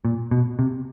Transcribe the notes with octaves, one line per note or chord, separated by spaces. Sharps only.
A#2
B2
C3